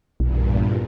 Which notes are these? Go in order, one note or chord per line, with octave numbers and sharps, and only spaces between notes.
B1 E2 G2 A#2